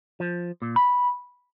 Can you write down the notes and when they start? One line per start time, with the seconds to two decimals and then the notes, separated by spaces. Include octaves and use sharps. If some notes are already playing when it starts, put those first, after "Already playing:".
0.20 F3
0.62 A#2
0.76 B5